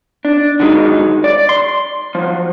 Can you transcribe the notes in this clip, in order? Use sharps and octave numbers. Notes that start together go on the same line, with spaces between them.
D4
D3 D#3 F#3 G#3 C#4 D#4
D5
C6
F3 F#3